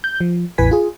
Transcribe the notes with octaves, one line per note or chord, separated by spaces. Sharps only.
G6
F3
A1 E2 E3 B4 G#5 B6
F4 G#4